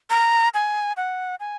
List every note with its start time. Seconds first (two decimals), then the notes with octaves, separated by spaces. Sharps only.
0.10 A#5
0.54 G#5
0.97 F#5
1.40 G#5